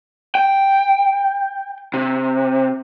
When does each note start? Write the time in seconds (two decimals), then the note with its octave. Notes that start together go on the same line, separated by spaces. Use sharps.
0.35 G5
1.94 C3